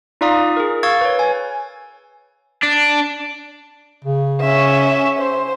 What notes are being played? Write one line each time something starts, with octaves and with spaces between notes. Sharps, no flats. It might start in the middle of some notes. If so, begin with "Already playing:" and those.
D#4 F4 D5 F5 A#5 D#6
G#4 A#4
F5 C#6 E6 G#6 A6
B4 C#5
G#5
D4
C#3
C#4 E5
C5